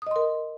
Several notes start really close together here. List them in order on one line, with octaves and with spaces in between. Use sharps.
D#6 D#5 C6 A#4